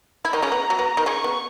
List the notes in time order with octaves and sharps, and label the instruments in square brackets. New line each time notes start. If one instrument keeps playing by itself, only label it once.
[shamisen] E4
[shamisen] D#3 D#4 [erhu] A#5
[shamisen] C#3 C#4
B3
F#3
B3
D#3 D#4
[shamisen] C#3 C#4 [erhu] C#6
[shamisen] B3